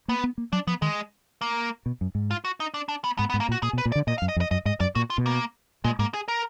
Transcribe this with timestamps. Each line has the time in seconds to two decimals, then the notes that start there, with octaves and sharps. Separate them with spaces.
0.08 A#3 B3
0.24 B3
0.38 A#3
0.53 F#3 D4
0.67 F3 B3
0.82 D#3 G#3
1.41 A#3
1.86 B2
2.01 F#2
2.15 G#2
2.31 F4
2.45 F#4
2.60 D#4
2.74 D4
2.89 D4
3.04 B3
3.18 G#2 B3
3.30 B3
3.34 G#2
3.40 A#3
3.49 A#2
3.52 F#4
3.62 A#2 G#4
3.73 B2
3.78 B4
3.86 A#2
3.92 D5
3.95 D3
4.07 A#2 D#5
4.18 F5
4.22 F#2
4.29 D#5
4.36 F2
4.41 D#5
4.51 F#2 D#5
4.65 G#2 D#5
4.80 F#2 D5
4.95 A#2 F#4
5.10 F4
5.18 B2
5.26 A#3
5.84 A#2 G#3
5.99 G#2 A#3
6.14 G#4
6.28 A#4